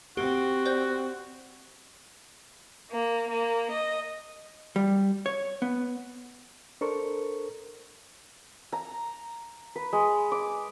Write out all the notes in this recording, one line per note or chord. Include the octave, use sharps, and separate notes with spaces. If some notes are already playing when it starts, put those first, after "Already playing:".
C4 F#4 G4
C5 D5 G6
A#3
A#3
D#5
G3
C#5
B3
D4 A4 A#4 C5 C#6
A#5
B4
G#3
D6